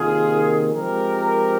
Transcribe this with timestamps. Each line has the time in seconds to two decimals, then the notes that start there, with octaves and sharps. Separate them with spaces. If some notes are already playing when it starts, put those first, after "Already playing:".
Already playing: C3 D#3 A#3 F4 G#4
0.74 F3 G#3 C4 G4 A#4